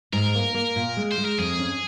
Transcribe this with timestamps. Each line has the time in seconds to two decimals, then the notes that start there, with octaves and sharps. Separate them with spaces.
0.13 G#2 A#4
0.35 A#3
0.54 A#3
0.76 A#2
0.97 G#3
1.11 C5
1.18 G#3
1.25 A#4
1.38 F2 G#4
1.59 C#4